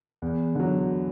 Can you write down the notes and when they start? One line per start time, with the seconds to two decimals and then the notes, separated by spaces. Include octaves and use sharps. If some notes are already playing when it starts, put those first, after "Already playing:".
0.22 E2
0.55 D3 F#3